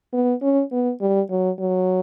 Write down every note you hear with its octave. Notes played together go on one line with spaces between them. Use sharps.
B3
C#4
B3
G3
F#3
F#3